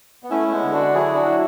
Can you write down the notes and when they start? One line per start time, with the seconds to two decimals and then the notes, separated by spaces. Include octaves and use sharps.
0.23 B3
0.30 A3 C#4 E4
0.48 A3
0.51 G#3 B3
0.63 D3
0.73 D4 F#4
0.94 F#3 E4 G#4
1.14 D4 F#4
1.25 E4